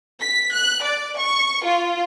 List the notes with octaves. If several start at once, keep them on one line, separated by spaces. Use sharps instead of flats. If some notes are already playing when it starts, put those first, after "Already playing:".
B6
F#6
D5
C#6
F4